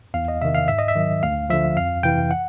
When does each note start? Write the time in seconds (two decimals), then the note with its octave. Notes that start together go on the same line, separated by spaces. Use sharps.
0.14 E2 F5
0.28 D#5
0.42 C3 D#3 E5
0.54 F5
0.68 G#2 E5
0.78 D#5
0.88 E5
0.95 D#3 F#3
1.23 D2 F5
1.50 D3 F3 E5
1.77 F2 F5
2.03 C3 E3 G5
2.31 F#5